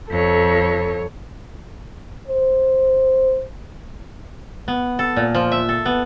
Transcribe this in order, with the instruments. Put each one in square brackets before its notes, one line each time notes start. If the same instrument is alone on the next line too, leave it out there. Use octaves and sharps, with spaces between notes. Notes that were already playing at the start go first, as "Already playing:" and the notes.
[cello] F2 C#5 [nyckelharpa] A4
[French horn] C5
[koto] B3
A4
A#2
F3
E5
A4
B3